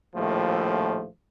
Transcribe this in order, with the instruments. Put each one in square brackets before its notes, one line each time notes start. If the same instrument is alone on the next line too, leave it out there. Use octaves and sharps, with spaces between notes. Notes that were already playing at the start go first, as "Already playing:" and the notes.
[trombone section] A#1 D#2 A2 F3 A3